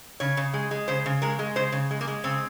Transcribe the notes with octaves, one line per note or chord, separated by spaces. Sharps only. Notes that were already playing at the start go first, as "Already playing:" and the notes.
C#3 C#5
C#3
G#3
G#3
C#3 C5
C#3
G#3 A#4
G#3
C#3 C5
C#3
G#3
A#3
G#3
C#3 C4